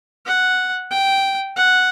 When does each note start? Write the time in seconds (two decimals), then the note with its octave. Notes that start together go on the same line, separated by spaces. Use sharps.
0.26 F#5
0.91 G5
1.56 F#5